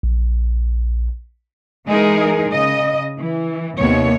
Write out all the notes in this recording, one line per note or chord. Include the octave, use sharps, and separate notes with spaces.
A#1
E3 G#3 D#4 G#4 A#4
C#3 D#5
E3
D#2 C3 B3 C#5